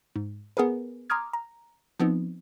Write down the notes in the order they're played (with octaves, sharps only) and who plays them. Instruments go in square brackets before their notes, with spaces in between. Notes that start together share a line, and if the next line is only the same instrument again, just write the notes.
[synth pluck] G#2
B3 G#4 A#4 B4
A#5 C6 D6 D#6 F6 G#6
A#5
F3 B3 C4 D#4